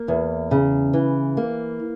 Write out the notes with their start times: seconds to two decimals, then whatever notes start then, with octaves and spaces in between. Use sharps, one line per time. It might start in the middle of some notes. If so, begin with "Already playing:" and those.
Already playing: A#3
0.08 E2
0.51 C#3
0.93 E3
1.37 A#3